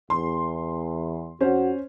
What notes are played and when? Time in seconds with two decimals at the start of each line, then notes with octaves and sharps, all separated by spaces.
0.10 E2 C6
1.41 F2 C#4 F#4 C5